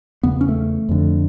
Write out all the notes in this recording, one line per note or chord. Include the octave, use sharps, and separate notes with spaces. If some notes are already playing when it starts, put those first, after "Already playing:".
E2 C#3 B3
C#4
A3
F2 D3